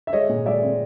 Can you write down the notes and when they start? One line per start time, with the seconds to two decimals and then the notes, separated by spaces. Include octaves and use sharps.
0.07 E5
0.13 G#3 C#5 D#5
0.29 A#2
0.46 G#3 D5 E5
0.63 C4